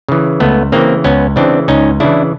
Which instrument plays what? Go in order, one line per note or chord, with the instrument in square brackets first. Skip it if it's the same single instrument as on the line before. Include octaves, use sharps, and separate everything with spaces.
[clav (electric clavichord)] C#3 E3
C#2 A3 B3
C#3 E3 A#3 C4
C#2 B3 C#4
C#3 E3 C4 D4
C#2 C#4 D#4
C#3 E3 D4 E4